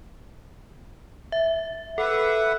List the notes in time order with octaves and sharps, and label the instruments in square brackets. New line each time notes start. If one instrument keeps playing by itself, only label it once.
[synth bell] E5
[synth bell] A4 [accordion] B4 E5 F#5